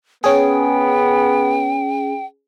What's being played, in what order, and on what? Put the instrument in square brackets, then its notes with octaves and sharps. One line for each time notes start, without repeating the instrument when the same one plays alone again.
[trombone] B3 [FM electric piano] C#4 G#4 [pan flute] G5